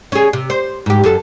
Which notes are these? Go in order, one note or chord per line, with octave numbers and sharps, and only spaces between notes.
C#4 G#4
C3
C5
G#2 G4
F#2 A4